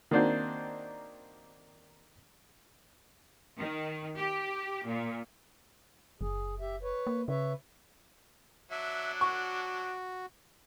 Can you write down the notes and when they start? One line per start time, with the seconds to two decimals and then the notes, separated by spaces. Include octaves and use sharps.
0.11 D#3 A#3 C4 D4 F#4 C5
3.58 D#3
4.16 G4
4.85 A#2
6.21 F#1 G#4
6.60 G4 E5
6.82 B4 C#5
7.07 A#3
7.28 C#3 B4 C#5 E5
8.71 F#3 D4 E5
9.21 F#4 C#6